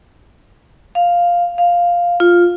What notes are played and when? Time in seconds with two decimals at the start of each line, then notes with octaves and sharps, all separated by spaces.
0.95 F5
1.58 F5
2.20 F4